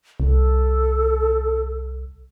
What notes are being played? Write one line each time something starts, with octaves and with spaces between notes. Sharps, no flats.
C2 A4